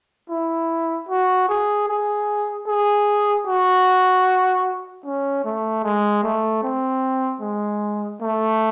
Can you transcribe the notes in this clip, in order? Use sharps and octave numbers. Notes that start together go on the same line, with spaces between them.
E4
F#4
G#4
G#4
G#4
F#4
C#4
A3
G#3
A3
C4
G#3
A3